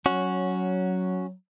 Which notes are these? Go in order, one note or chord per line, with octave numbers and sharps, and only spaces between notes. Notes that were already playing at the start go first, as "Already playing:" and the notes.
F#3 C#4 F#4